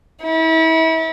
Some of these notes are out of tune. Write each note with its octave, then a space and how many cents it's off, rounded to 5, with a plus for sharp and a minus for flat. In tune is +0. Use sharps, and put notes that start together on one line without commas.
E4 -35